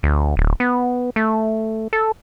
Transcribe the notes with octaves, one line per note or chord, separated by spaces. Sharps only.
D2
D1
B3
A3
A4